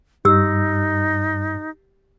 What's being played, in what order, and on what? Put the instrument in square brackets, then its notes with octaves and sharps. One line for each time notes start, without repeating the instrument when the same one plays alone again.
[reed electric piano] G2 [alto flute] D#4 [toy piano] G4 E6